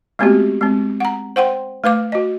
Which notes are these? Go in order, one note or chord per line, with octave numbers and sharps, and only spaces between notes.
G#3 A3 B3 C4 F#4 G4
G#3 C4
F#5 A#5
C5 F#5 G5 C6
A3 B4 F5 D6
F#4 D#5